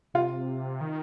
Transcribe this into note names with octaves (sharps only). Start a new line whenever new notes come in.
C3 F4
D#3